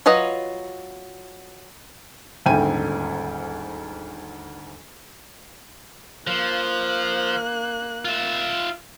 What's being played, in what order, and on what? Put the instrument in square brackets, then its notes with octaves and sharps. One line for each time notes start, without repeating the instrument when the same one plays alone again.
[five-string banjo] F#3 F4 B4 C#5 D#5
[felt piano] D#1 D2 G#2 G5 G#5 D#7
[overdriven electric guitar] F3 [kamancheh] A#3 F#6
[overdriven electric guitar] F4 E5